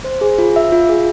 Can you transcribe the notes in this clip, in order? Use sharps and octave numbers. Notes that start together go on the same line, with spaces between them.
C5
G#4
F4
E5
F4
G#4